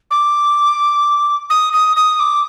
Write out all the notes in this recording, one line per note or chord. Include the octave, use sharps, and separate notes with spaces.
D6
D#6
D#6
D#6
D6